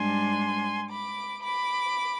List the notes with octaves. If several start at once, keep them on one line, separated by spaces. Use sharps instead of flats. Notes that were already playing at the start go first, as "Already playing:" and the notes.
Already playing: G#2 G3 D4 G#5 C6
B5 D6
B5 D6